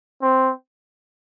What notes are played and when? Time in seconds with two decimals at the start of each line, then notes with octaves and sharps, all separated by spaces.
0.22 C4